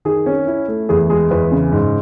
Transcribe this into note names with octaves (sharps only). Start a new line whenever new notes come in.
D#3 G#4
C#4
E4
A3
E2 G#4
G#3 G#4
E2 B4
C#3
G#2